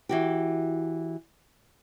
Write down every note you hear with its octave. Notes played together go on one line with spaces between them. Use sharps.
E3 F#4 G4